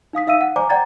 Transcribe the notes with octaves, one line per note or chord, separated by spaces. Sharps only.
D#4 F5 D#6 B6
D#4 E5 F5 E6 D#7
F#5
C5 D5 G#5 A#5 D6
D5 F#5 G5 A#5 G#6 A6